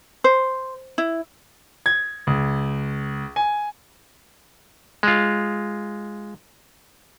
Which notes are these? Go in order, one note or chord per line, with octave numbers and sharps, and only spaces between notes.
C5
E4
G#6
C#2
G#5
G#3 F4